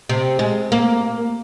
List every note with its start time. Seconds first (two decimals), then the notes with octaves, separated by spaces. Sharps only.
0.09 C3
0.39 G#3
0.72 A#3